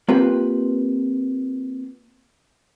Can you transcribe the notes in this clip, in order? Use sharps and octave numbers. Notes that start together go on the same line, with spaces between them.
A#3 C4 F4 G4 B4